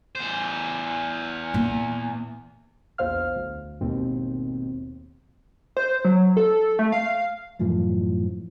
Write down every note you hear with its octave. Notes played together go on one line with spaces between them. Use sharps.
E2 C5
A#2
A#1 E2 C5 F5 F6
D2
G#1 D#2 B2 C4
C5
F#3
A4
A3
F5
F#2 A2 E3 F3